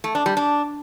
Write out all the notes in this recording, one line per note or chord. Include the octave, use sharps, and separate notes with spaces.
A3
D4
G3
D4